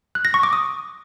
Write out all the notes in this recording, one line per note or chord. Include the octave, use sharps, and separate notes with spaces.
F#6
A#6
C#6
D6
D#6